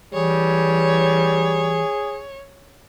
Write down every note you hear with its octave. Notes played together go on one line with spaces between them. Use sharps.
E3 G3 G#4 C#5